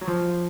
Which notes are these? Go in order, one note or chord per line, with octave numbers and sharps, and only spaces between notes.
F#3
F3